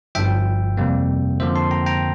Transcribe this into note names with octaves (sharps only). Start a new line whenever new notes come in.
G1 G2 F3 E5 G5
F2 C3 G3 A#3
F2 D3 F3 A#3 C5 E5
A5 C6
G5 A#5
G5 A#5